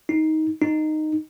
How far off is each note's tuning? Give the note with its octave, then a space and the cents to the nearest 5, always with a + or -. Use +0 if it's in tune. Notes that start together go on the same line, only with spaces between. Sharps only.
D#4 +15
D#4 -10